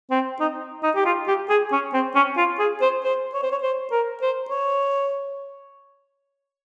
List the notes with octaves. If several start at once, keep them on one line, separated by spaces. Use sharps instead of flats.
C4
D#4
D#4
G4
F4
G4
G#4
C#4
C4
C#4
F4
G#4
C5
C5
C#5
C5
C#5
C5
A#4
C5
C#5